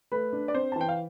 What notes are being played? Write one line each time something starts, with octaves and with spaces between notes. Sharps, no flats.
A3 B4
D4
D5
C4 C5
A5
E3 G5
F5